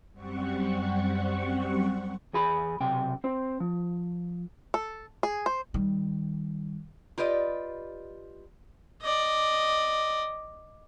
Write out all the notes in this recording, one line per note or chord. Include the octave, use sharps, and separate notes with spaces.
F#2 G3 C4 F#5 C#6
E2 G#4 B5
B1 C3 G5
C4 C5
F3
A4
G#4
C5
D#3 G3
F4 G4 B4 D5 D#5
D5 D#5